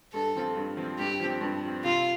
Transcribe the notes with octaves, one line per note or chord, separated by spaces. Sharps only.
G2 A4
F3 C4 F4
G2
F3 C4 F4
G2 G4
F3 C4
G2
F3 C4
C3 F4